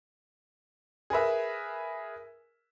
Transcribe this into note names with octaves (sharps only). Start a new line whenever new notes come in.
G#4 A#4 B4 E5